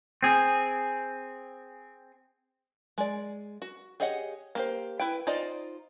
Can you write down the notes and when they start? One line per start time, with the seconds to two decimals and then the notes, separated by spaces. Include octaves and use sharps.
0.23 C4 G#4
2.98 G#3 D5
3.62 F#4
4.00 G4 G#4 C#5 D#5 F#5
4.55 A#3 G4 C5
5.00 E4 B4 G5
5.27 D#4 F4 C5 D5 D#5